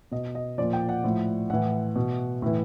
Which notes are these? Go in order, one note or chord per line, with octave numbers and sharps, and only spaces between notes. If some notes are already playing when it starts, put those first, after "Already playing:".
B2 D#5
D#5
A#2 F3 D5
G5
F#5
A2 F3
A2 E3 F#5
B2
A2 E3